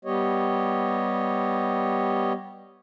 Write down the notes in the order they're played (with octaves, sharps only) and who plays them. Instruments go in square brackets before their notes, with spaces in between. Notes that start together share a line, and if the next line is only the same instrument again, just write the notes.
[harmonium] G3 B3 G4 C#5 D#5